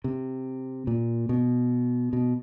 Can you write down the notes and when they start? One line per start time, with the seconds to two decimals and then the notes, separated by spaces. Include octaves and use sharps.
0.04 C3
0.87 A#2
1.29 B2
2.13 B2